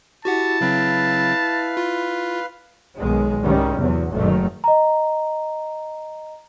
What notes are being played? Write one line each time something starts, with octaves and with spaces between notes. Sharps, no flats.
E4 F#4 G4 F#5 A5
C#3 F#3 C4 B4 F5
F4
B1 B2 D#3 G#3
C2 G#2 D#3 G3 C#4
E2 C3 F#3
F#1 D#3 F#3 A3
D#5 A#5